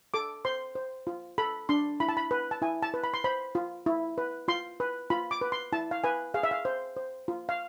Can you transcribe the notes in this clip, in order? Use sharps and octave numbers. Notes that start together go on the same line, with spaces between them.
A4 D6
C5 C6
C5
F4
A4 B5
D4 C6
E4 B5
A5
B5
B4
A5
E4 G#5
A5
B4
B5
C6
C5 B5
F4
E4
B4
F4 C6
B4
F4 B5
D6
B4
C6
E4 A5
F5
B4 G#5
G#4 F5
E5
F5
C5
C5
F4
F5